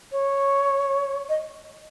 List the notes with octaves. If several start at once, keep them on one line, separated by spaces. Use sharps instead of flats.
C#5
D#5